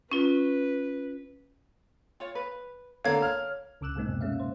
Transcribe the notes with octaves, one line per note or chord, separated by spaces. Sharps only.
C#4 F4 B4
F4 C#5
B4
D3 A#3 C#5 F5 G#6
F6
C#2 C#3 D6 E6 F#6 E7
A2 C3 G#3 A#3 C4 D#4
F#2 B2
G#3 A#3 C#4 E5 F5
C5